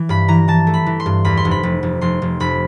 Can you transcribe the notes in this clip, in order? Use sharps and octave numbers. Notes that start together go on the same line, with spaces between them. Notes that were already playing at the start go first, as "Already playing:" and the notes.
Already playing: E3
G2 B5
E3 A#5
E3 A5
A3
B5
E3
C6
G2
E2 B5
C6
F1
B5
F1
F1
F1 C6
F1
F1 B5